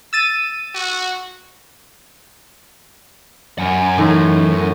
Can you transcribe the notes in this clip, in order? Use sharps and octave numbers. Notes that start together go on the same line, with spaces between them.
E6 A6 D#7
F#4
F#2 F#5 G#5
A2 E3 D#4